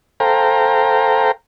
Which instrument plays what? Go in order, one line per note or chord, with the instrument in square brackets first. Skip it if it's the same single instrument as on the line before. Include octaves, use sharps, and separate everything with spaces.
[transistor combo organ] A4 C5 F5 G5 A#5